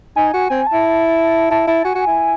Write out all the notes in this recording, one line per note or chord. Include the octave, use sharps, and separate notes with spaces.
D#4 G#5
F#4
C4 G#5
A5
E4
E4 A5
E4 A5
F#4 G#5
F#4
E4